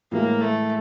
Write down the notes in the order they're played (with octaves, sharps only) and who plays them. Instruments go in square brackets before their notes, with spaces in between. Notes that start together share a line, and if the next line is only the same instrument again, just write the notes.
[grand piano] A2 E3 G#3 [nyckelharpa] A#3
[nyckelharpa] A3